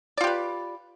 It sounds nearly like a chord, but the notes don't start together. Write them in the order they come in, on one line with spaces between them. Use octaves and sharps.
D5 F4 G4 B4